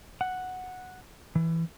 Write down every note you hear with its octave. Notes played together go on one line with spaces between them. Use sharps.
F#5
E3